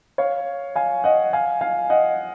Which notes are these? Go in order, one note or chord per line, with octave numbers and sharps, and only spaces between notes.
C#5 F5
F5 G#5
D#5 F#5
F5 G#5
F5 G#5
D#5 F#5